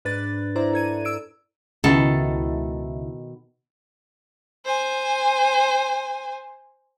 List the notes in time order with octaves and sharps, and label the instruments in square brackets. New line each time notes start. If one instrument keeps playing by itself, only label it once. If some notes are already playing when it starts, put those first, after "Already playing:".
[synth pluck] G#2 D4 B4 F#6 A6
E4 C5 D5 A#5
A4 G#6 D#7
E6 D7
[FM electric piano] C#2 E4 [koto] B2 D#3 A4
[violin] C5 G#5